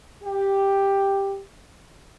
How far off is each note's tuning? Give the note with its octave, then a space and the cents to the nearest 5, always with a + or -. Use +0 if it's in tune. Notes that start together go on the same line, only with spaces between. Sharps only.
G4 +5